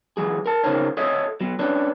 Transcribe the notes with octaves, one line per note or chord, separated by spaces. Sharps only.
E3 F#3 G#4
A#4 A5
C#3 E3 D#4 A#4 C5 C#5
A4 C#5 D#5 E5
F#3 B3
C#4 D4 B4